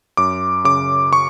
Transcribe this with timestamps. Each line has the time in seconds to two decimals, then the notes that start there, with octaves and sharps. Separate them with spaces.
0.17 F#2 D6
0.64 C#3 D6
1.13 C#6